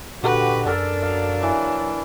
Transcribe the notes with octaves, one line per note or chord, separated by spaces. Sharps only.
A#2 D3 F#4 G4 B4
F#2 D4 A4 A#4
F#3 F5
E3